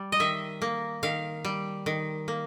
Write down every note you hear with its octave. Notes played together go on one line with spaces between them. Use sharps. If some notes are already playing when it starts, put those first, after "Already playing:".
Already playing: G3
D#5
D#3 E5
A#3
D#3 F5
G3
D#3
A#3